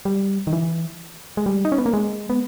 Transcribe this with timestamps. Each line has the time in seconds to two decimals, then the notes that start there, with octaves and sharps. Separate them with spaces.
0.05 G3
0.47 D#3
0.53 E3
1.37 G#3
1.46 G3
1.65 D#4
1.72 C#4
1.78 B3
1.86 A#3
1.93 G#3
2.30 B3